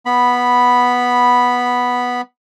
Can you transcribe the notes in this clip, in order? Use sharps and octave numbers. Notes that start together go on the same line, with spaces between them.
B3 B5